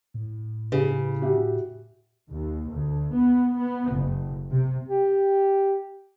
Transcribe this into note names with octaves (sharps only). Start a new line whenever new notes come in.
A2
C#3 G4 G#4 B4
F#4 G4 E5
D#2
D2
B3
B3
F#1
C3
G4